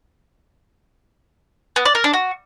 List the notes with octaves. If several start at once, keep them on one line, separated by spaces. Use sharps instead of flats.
B3
D5
A#4
D4
F#4